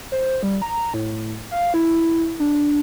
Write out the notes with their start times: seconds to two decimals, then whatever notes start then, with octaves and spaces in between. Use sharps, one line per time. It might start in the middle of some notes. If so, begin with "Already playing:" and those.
0.12 C5
0.43 G3
0.62 A#5
0.94 A2
1.51 F5
1.74 E4
2.40 D4